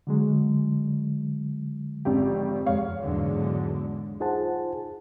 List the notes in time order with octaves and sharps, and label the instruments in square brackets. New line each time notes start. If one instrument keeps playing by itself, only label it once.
[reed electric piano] D3 F#3 G#3
[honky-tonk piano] G#1 F2 G4
[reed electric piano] F2 G#3 [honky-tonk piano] C#5 F5
[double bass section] E2 G#2 D3 F#3 G#3
[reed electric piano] D#4 F4 G#4 C5 F#5 A5